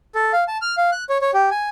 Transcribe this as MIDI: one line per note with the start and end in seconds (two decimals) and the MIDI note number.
0.15 0.32 69
0.33 0.44 77
0.48 0.58 81
0.62 0.75 89
0.77 0.90 77
0.92 1.04 90
1.09 1.18 73
1.21 1.31 73
1.34 1.50 67
1.51 1.69 80